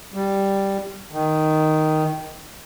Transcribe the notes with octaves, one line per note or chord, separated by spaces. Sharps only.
G3
D#3